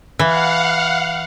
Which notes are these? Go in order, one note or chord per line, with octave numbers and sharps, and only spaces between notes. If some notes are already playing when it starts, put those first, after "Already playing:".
E3 F5 F#5